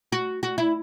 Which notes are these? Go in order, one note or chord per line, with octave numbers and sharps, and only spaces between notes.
F#4
F#4
E4